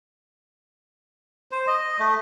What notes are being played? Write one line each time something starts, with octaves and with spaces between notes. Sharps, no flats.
C5
D#5
A3